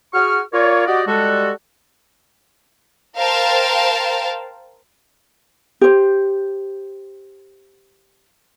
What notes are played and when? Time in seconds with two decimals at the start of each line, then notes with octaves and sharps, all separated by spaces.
0.14 F#4 G#4 C#6 F6
0.53 F4 A#4 C#5 D5
0.87 F#4 G4 D5 D#5
1.07 G3 G#3 F#4 A4
3.17 A#4 C5 F5 G5 A5
5.81 G4 C5